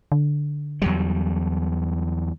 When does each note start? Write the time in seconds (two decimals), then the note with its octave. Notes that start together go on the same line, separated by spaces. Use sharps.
0.12 D3
0.82 E2 F#3 G3